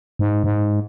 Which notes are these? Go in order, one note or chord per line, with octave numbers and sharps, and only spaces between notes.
G#2
G#2